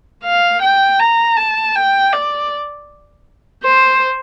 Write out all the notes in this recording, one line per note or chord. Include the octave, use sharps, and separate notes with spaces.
F5
G5
A#5
A5
G5
D5
C5